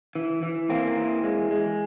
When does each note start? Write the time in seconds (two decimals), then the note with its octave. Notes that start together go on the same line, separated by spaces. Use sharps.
0.15 E3
0.43 E3
0.69 E2 A#3 C4
0.97 E3
1.24 G#3
1.51 G#3